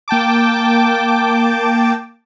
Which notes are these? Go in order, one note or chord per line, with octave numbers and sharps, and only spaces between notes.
A#3 G5 A5 D6